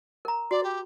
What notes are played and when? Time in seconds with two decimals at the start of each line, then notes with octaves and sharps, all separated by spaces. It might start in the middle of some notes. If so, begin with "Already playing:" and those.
0.25 A#4 A#5
0.51 F#4 D5
0.63 G4